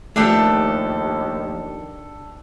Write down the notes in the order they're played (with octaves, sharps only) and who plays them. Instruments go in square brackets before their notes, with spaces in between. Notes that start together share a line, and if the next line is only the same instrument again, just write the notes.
[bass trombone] D#2 [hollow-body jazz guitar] F3 A3 [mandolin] D4 G4 A4